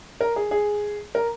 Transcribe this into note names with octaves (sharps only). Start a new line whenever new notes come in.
A#4
G#4
G#4
A#4